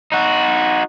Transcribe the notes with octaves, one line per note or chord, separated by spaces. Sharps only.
D#4 F#4